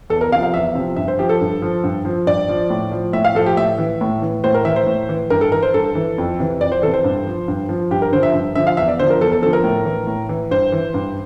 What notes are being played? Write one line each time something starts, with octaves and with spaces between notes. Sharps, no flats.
E2 A4
A#4
C3 F3 F5
F5
E2 E5
C3 F3
G2 E5
C5
F3 G4
A4
G2
F3
G2
F3
G2 D5
F3
A2
F3
A2 E5
F5
F3 A4
G4
A2 E5
E3
A2
E3
A2 C5
A#4
E3 E5
C5
A2
E3
G2 A#4
A4
E3 A#4
C5
G2 A4
E3
F2
C3 E3
F2 D5
C5
C3 E3 A4
C5
G2
F3
G2
F3
G2 G4
A#4
D3 F3 C5
E5
G2
D3 F3 E5
F5
E2 E5
D5
D3 F3 C5
A#4
E2 A4
A4
D3 F3 A4
A#4
A2
E3
A2
E3
G2 C5
E3
G2